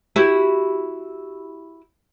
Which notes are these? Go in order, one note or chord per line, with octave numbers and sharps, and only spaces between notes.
E4 F#4 G4